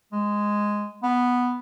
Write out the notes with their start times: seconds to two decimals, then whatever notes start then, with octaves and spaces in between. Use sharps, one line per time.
0.12 G#3
1.03 B3